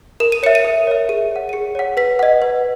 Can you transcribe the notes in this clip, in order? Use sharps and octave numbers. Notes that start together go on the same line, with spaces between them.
A#4 E7
D#7
C#5 E5 C#7
D#7
A#4
C#5 E5
G#4 D#7
C#5 F#5
D#7
G#4 C#7
C#5 F#5
B4 B6
D#5 F#5
B4